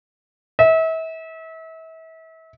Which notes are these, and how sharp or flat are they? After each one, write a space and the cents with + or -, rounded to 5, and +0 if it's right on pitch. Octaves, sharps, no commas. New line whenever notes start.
E5 -35